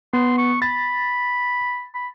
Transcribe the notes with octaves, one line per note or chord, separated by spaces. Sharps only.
B3 C6
C#6
B5 A6
B5